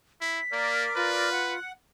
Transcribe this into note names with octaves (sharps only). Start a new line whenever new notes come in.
E4 B6
A#3 A#4 D5
F4 B4
F#5